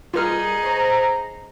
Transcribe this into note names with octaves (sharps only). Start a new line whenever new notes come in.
G3 D#4 F4 G4 G#4 A#4 B4 F6
C5 C#5 A#5